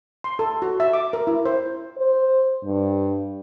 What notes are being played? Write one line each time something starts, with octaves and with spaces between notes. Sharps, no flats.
C6
A4
F#4
E5
D6
A#4
E4
C5
C5
G2